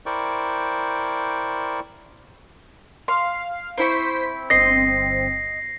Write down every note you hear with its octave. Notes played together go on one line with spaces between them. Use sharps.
E4 A#4 C5 D5 G5 C#6
F5 C6
C4 E4 C5 C#6 B6
G1 C4 D#5 A#6 C7